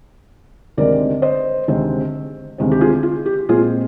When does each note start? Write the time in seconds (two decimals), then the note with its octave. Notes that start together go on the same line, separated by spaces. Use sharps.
0.77 D2 C3 D#3 G#3 C4 A#4 D5
1.22 C5 D#5
1.68 D2 C3 D#3 G#3 C4
2.58 D2 C3 D#3 G#3 C4
2.71 G4
2.81 F4 G#4
3.03 F4
3.26 G4
3.49 A#2 G#3 C4 F4 G#4